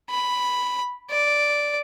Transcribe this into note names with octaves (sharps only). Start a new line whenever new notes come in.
B5
D5